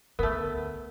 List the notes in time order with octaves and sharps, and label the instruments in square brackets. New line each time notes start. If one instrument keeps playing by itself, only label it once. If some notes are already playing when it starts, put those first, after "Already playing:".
[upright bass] D2 [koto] A3 B3 [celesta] A#4